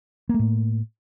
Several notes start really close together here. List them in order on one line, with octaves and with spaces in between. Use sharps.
A#3 A3 A2